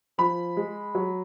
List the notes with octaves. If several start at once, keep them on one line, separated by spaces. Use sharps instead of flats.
F3 B5
G#3
F#3